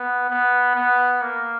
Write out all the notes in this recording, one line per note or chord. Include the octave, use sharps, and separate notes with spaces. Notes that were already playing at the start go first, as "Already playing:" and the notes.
Already playing: B3
B3
B3
A#3